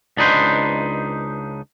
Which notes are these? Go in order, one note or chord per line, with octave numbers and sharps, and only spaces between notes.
C#2 D4 D#4 B4 C5